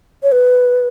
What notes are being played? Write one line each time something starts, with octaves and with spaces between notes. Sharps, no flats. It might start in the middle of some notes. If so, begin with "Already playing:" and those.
C#5
B4